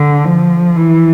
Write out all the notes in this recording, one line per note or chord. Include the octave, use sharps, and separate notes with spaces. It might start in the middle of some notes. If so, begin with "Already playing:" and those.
Already playing: D3
F3
E3